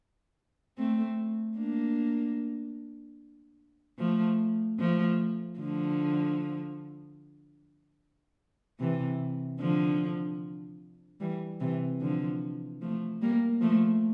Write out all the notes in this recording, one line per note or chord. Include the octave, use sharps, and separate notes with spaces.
A3 C4
A#3 D4
F3 A3
F3 A3
D3 F3
C3 E3
D3 F3
E3 G3
C3 E3
D3 F3
F3 A3
G3 A#3
F3 A3